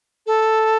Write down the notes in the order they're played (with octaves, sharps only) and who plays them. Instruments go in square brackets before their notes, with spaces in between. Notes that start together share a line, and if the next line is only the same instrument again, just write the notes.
[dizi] A4